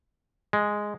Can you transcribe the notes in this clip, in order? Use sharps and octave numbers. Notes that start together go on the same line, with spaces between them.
G#3